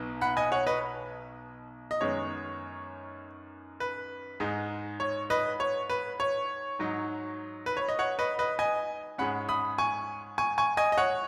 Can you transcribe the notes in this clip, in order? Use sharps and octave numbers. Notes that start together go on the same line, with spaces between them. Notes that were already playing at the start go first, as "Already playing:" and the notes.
Already playing: B1 B2 B3 D#4
F#5 B5
D#5 G#5
C#5 F#5
B4 D#5
D#5
F#2 D#3 G#3 B3 D#4 C#5
B4
G#2 G#3 D#4
C#5
B4 D#5
C#5
B4
C#5
G#2 F#3 D#4
B4
C#5
D#5
C#5 F#5
B4 D#5
B4 D#5
D#5 G#5
G#2 G#3 C#4 F#5 B5
B5 D#6
G#5 C#6
G#5 C#6
G#5 C#6
D#5 G#5
D#5
C#5 F#5